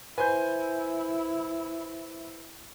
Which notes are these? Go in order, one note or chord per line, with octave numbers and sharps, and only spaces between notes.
E4 B4 C5 G#5 G6